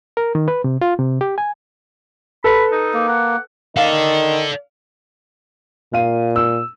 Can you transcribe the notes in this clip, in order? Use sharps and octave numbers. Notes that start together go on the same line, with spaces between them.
A#4
D#3
B4
C3
F4
C3
G4
G#5
A4 B4 B5
D#4
A#3
F#5
D#3 A4 D5 F5
A#2 F5 D#7
E6